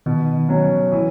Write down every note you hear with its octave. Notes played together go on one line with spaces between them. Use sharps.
B2 D#3
F#3 C#4
E3